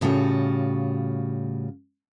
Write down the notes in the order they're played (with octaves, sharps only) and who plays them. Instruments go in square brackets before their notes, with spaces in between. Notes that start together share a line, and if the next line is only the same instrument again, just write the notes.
[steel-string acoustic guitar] A2 C#3 G3 F4 F#4